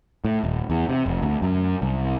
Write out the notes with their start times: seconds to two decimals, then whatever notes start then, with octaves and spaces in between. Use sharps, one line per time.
0.25 A2
0.44 D#1
0.70 E2
0.89 C3
1.06 F1
1.22 D2
1.42 F#2
1.82 C2